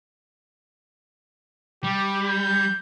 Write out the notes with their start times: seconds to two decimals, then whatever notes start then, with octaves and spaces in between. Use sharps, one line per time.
1.84 G3 G4
2.27 G6